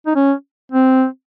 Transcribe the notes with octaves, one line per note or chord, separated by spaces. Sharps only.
D#4
C#4
C4